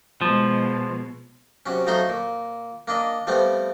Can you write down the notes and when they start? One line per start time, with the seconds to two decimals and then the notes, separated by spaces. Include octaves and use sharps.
0.21 B2 F3 G#3
1.66 C3 F#3 C#4
1.87 F3 F#3 A3 D#4 A#5 C6
2.09 A#2
2.88 A#3 D4 D#5
3.27 F3 G3 A3 B3 C4